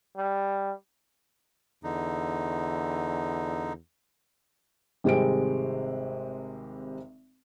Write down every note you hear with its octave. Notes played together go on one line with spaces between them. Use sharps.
G3
E2 D3 D#4
G#1 C3 G3 G#3 C4 D7